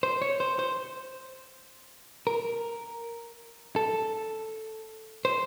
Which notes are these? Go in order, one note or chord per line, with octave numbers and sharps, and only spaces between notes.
C5
C#5
C5
C5
A#4
A4
C5